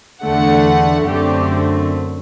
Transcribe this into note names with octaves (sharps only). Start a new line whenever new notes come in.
E2 D3 A3 F#5
F#2 D3 A3 C4 G4